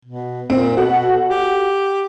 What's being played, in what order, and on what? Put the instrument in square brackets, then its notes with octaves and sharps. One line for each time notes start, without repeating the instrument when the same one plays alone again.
[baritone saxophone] B2
[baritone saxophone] A#2 [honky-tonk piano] C4
[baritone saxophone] B2 [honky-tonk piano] F#4 A4 F#5
[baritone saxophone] G4